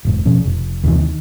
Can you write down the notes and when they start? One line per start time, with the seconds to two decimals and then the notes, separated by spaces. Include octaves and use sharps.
0.05 E1 G#2
0.26 B2 F3 C#4
0.45 F1
0.84 D#2 C3 E3
1.00 D#3